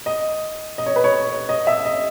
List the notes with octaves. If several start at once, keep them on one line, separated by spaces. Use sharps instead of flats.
D#5
D#5
C#5
B4
C#5
D#5
E5
D#5